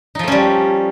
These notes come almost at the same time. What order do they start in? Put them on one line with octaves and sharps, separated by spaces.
D#4 F3 A3 C#4 G3